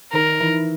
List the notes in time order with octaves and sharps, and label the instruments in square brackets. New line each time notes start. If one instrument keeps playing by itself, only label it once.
[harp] D#3 D#4 [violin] A#4
[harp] E3 E4